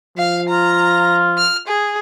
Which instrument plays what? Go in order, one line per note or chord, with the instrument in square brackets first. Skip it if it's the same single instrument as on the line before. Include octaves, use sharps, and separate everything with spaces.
[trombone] F3 [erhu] F5
[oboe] F4 [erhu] A#5
[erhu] F6
G#4